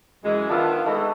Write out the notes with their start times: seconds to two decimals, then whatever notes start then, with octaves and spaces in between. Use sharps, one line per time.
0.24 F#2 E3 G#3
0.49 D#3 B3 D4 F4 E5
0.86 G#3 A3 B3 D#4